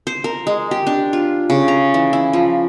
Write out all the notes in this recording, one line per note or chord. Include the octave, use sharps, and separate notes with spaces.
C5
A#4
G#3
G4
D4
F4
C#3
A#5
E3
E4
F3